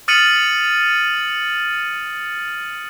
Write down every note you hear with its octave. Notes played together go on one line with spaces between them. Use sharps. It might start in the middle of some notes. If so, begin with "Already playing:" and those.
D#6 F6 A6 C#7 D#7 F#7